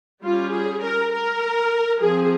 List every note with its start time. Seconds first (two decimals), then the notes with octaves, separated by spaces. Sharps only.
0.23 G3 C#4 F4
0.52 G#4
0.82 A#4
1.12 A#4
2.00 F3 C4 G#4